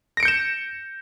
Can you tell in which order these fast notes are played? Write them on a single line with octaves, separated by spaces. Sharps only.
A#6 D7 C#7 G6 E7